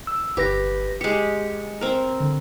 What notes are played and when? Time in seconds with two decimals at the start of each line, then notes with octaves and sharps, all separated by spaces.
0.07 E6
0.37 G1 G4 B4 A#6
1.01 G#3 G4 C#7
1.81 C4 A#4
2.20 D3